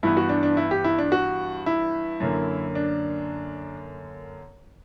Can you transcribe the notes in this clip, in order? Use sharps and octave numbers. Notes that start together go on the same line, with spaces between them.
G2 E3 B3 E4
F#4
D4
D4
E4
G4
E4
D4
F#4
E4
F#2 D3 A#3
D4